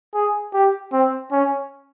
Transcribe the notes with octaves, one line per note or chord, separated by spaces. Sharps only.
G#4
G4
C4
C#4